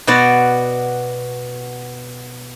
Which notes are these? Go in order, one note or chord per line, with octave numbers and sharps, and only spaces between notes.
B2 B3 F#4 D5